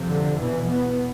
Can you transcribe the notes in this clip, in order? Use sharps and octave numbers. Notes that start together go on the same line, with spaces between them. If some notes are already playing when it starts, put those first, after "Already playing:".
Already playing: F2 C3
D3
E2 B2 E3
B3